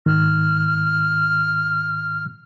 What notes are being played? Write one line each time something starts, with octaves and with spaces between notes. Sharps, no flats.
G#2 D#3 F6